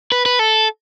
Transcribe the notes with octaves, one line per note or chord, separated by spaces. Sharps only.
B4
B4
A4